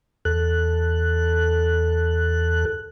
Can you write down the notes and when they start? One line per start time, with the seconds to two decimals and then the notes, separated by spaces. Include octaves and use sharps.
0.25 E2 A4 F#6